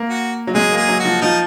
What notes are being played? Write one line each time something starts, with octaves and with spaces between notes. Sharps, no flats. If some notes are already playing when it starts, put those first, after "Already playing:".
Already playing: A#3
F#4
F#3
G#3 G#4
A#3
G#4
F#3
F#4
F3
F3 D#4